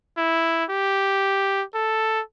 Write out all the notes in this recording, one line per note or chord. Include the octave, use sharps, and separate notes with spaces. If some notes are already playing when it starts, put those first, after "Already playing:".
E4
G4
A4